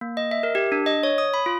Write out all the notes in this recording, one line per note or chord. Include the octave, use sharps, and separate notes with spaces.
A#3
D#5
E5
A#4
G4
D4
D#5
C#5
D#6
B5
F4